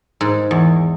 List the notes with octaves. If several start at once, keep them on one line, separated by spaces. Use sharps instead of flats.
G#2
E2